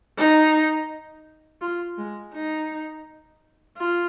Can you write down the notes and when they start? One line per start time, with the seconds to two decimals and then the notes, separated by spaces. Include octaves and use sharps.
0.18 D#4
1.61 F4
1.98 G#3
2.33 D#4
3.78 F4